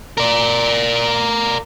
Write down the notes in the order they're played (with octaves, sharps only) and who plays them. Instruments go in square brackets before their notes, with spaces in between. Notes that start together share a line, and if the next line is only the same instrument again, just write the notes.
[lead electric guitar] A#4 D5